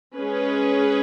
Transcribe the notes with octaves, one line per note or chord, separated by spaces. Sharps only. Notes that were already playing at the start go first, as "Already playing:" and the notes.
G#3 C#4 G#4 B4